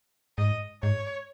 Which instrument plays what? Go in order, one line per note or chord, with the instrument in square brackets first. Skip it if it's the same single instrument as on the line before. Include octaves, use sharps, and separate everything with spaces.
[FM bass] G#2 [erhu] D#5
[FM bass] G#2 [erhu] C#5